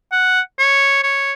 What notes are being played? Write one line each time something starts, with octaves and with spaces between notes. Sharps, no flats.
F#5
C#5
C#5